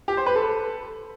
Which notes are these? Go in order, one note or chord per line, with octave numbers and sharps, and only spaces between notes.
G4
C5
B4
A4